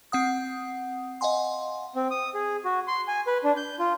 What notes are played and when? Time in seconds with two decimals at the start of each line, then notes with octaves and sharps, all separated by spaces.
0.12 C4 F#5 D#6
1.21 D#5 F5 F#5 G#5 C6
1.95 C4
2.11 D#6
2.34 G#4
2.64 F#4
2.88 C6
3.08 G#5
3.27 B4
3.44 D4
3.57 G6
3.79 F4